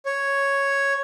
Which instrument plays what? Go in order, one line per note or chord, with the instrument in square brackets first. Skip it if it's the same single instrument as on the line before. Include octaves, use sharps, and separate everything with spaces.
[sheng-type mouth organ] C#5